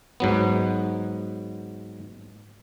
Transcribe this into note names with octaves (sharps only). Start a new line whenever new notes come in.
G#2 F#3 B3